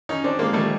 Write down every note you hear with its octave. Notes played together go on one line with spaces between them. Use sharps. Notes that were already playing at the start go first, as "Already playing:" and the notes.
C#4 D#4
C4 D4
G#3 A#3
G3 A3